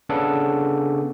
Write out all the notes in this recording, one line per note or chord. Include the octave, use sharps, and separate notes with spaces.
C#3 B3 D4 A4